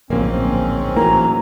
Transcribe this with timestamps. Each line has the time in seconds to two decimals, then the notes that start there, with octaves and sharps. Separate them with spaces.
0.10 D1 A#1 G#2 A#3 C4 C#4
0.96 A1 E3 F#3 A#3 A#5